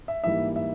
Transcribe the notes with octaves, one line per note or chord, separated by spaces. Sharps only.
E5
G#2 E3 G3 A#3 E5
E5